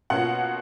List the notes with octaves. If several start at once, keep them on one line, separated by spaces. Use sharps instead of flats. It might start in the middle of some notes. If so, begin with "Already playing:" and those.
B2 A#3 C#4 F4 F#5